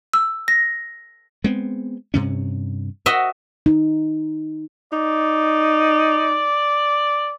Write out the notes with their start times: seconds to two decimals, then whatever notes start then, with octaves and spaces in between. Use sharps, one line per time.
0.14 E6
0.48 A#6
1.44 G#3 B3 C4
2.14 G2 C3 C#4
3.06 F#4 D#5 E5
3.66 D#4
4.93 D#4 D5